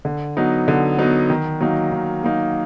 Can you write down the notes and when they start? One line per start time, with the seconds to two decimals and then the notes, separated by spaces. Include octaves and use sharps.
0.05 D3
0.37 F#3 B3 D#4
0.68 D3
0.99 F#3 B3 D#4
1.30 D#3
1.61 F#3 A#3 D#4
1.92 D#3
2.23 F#3 A#3 D#4